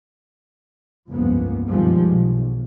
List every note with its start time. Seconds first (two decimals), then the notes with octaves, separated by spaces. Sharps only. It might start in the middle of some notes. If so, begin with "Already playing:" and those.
1.08 F1 C#2 G2 F3 A#3 B3
1.69 F#2 B2 D#3 F3 G3 G#3
2.05 B1